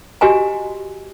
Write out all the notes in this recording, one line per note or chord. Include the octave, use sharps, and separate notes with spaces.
F#4 G4 D#5 G#5 A#5